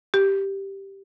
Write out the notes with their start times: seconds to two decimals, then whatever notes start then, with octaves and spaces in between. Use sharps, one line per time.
0.14 G4